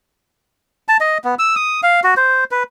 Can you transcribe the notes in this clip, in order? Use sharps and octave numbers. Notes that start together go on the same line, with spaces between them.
A5
D#5
B3
E6
D#6
F5
F#4
C5
B4